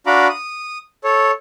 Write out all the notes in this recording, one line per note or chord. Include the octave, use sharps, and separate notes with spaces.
D4 F#4 F5 A#5 B5 D6
D#6
A4 C#5